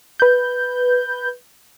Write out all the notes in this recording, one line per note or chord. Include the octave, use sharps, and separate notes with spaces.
B4 G6